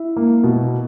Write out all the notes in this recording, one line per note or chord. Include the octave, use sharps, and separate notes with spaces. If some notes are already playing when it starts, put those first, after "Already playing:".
Already playing: E4
A#3
B2